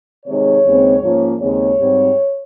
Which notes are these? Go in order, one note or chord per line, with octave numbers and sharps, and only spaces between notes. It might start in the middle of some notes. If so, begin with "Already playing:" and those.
C3 D#3 G#3 C#5
D#2 C#3 G#3 C4
G#2 F3 A#3 C#4
D#2 C#3 G#3 C4 C#5
G#2 G3 C4